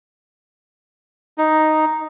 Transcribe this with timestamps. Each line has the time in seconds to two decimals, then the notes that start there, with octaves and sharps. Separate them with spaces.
1.38 D#4